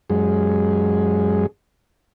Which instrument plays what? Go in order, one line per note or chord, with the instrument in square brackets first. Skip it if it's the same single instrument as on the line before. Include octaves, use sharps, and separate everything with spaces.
[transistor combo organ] F#2 G#3